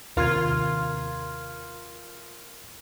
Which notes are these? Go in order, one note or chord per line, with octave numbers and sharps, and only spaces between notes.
D#2 C3 F4 A#4 C6 G#6